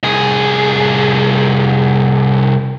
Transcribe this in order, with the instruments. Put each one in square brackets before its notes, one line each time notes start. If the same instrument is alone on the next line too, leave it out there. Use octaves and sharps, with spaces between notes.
[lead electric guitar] C2 G#4